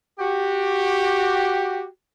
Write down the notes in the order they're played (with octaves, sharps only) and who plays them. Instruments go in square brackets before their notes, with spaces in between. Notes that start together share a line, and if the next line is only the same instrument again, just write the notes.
[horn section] F#4 G4